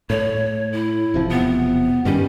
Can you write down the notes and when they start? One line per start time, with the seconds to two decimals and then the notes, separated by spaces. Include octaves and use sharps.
0.10 A2 A3 C#5
0.72 E4
1.14 E1 C3 F3
1.30 B3
2.05 G2 D#3 G3 C#4